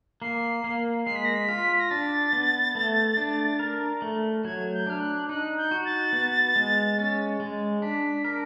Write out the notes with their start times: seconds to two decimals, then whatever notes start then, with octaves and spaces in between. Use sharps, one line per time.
0.22 A#3 C7
0.64 A#3
1.06 G#3 C7
1.15 B6
1.25 A#6
1.35 B6
1.49 F4
1.79 A#6
1.90 D4 A6
2.33 B3
2.75 A3
3.17 D4
3.59 A#4
4.02 A3
4.45 F#3 G#6
4.73 G6
4.87 D4 F6
5.00 F#6
5.29 D#4 F#6
5.57 G6
5.71 F#4
5.85 A6
6.13 B3
6.56 G#3
6.98 C#4
7.40 G#3
7.82 D4 B6
8.25 A#4